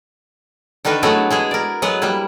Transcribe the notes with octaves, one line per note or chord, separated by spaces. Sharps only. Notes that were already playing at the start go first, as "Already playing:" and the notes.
D3 D#3 D4 A#4 B4
F#3 G#3 A3 B3 E4 F#4
G#3 E4 G#4
A#4 D5
F#3 G#3 B3 B4
G3 A#3 E4